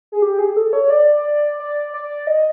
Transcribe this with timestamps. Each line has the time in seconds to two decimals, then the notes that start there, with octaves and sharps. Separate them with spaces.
0.12 G#4
0.22 G4
0.39 G#4
0.56 A4
0.73 C#5
0.90 D5
1.59 D5
1.94 D5
2.27 D#5